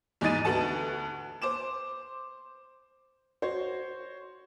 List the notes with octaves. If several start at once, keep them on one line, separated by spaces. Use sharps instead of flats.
E2 G#2 D#4 D#5 A6 D#7
D2 B3 F#4 A4 A5
C5 D6 E7
F#4 C5 C#5